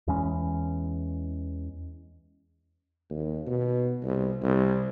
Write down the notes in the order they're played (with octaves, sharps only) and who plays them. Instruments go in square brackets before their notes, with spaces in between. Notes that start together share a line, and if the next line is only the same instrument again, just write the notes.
[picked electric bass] E2 E3 G#3 C#4
[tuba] D#2
B2
C2
C2